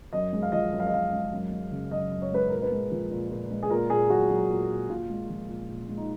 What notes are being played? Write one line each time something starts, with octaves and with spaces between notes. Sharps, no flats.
F#2 D#5
G#3
F5
F3 D#5
F#2
F5
D#5
F#2 F5
G#3
F#2
G#3
C#3
F#2 D#5
F#2
C#5
G#3 B4
A#2 A#4
B4
G#3
F3
A#2
A#2
G#3
G#4
A#2 A#4
A#2 G#4
F#3 F#4
F#3
A#2
A#2
A#2 F4
G#3
F3
A#2
A#2
G#3
D#4